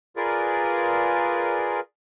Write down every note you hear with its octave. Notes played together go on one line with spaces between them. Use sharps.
F4 G#4 A#4 B4 D5